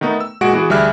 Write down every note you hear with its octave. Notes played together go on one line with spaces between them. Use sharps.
D#3 A3 B3 D#4
E6
A#2 G#3 F#4 G#4 F#5 D7
E3 B3 F#4 G#4
D2 G3 G#4 E5 F6 F#6